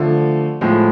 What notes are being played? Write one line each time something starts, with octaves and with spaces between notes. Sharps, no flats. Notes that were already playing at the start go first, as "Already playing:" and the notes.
Already playing: D3 F3 A3
A2 F3 G#3